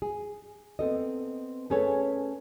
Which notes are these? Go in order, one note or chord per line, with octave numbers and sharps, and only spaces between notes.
G#4
B3 C4 A4 D#5
A3 C#4 G#4 A4 B4 C#5